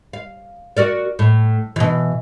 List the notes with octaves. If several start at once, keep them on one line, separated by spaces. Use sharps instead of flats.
F5
F#4 A#4 D5
A2
B2 E3